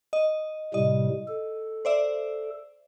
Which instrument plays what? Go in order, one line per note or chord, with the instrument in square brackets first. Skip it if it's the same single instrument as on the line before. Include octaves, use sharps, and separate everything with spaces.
[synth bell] D#5
[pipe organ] A2 C3 G3 [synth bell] D#5
[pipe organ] A4
[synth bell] C5 D5 E5